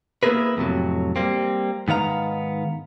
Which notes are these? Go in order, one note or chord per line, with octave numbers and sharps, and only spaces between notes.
A#3 B3 E4 G#4 A#4 B4
F2 A2 C3 F#3
G3 A#3 C4
G#2 D#3 B3 F5 A#5